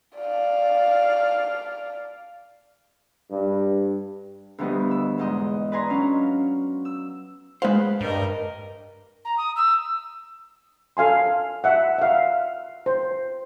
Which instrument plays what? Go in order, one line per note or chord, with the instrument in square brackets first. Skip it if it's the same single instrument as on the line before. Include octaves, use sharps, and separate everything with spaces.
[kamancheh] D5 F5
[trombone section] G2
[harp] D2 F3 G3 B3 B4 D#5
E6
E2 G#2 D#5
B4 D5 D#5 G#5 A#5 C6
F#3 C#4 D4 F5
E6
[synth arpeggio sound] G#3 F5 [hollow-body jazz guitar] B4 C5
[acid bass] G2 [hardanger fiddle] A#4 D#5
[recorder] A#5
D#6
E6
[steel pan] A4 F5 G#5 C6
E5 F#5
E5 F5
C5